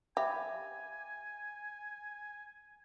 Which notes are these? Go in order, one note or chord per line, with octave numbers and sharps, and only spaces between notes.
G4 E5 F5 G#5 B5